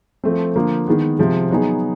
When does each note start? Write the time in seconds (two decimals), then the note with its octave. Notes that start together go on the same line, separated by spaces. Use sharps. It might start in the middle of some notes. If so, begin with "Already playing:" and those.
0.24 F3 A3 C4
0.56 D3 F3 A#3
0.87 D#3 G#3 B3
1.19 C3 F3 G#3
1.50 F#3 B3 D#4 G#4